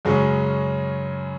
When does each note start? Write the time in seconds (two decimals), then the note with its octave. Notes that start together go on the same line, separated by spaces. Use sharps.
0.05 F#2 C#3 G#3 C#4 F#4